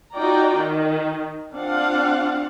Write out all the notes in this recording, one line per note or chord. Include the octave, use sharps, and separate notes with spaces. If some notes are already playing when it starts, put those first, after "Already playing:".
D#4 F4 F#4 D5 G5 A#5
D#3
C4 D4 F4 F5 F#5